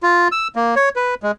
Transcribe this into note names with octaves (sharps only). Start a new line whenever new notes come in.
F4
E6
A#3
C#5
B4
G#3